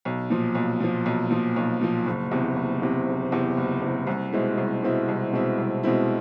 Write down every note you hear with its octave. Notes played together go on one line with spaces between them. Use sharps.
B1
A#2 F3
B1
A#2 F3
B1
A#2 F3
B1
A#2 F3
F#1
E2 C3
F#1
E2 C3
F#1
E2 C3
F#1
E2 C3
C2
B2 G#3 C4 E4
C2
B2 G#3 C4 E4
C2
B2 G#3 C4 E4
C2
B2 G#3 C4 E4